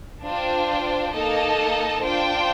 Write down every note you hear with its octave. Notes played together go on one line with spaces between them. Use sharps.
D4 F4 C5 G5
A#3 D#4 A4 D#5 A5
D4 F4 C5 G5